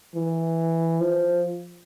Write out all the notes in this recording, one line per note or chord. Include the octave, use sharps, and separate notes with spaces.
E3
F3